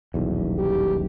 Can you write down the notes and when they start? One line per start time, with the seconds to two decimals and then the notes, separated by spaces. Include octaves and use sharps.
0.14 D#1 B1 E2
0.58 G4